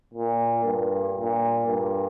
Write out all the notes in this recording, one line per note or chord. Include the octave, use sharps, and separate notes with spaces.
A#2
G2
A#2
G2